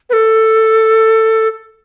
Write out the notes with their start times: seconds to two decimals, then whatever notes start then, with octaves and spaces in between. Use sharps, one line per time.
0.10 B4
0.13 A4